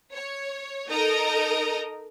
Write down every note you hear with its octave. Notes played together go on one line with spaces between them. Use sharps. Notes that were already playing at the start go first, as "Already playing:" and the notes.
C#5
D#4 A4 A#4 D#5 A#5